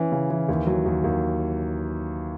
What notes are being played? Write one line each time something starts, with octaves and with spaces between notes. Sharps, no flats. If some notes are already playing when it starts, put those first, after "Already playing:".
Already playing: E3 C#4
C#3
E3
D#2
F#3
D#2
D#2